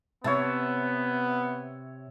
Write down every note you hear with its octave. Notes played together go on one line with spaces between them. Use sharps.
C3 B3 C#5 E5 A5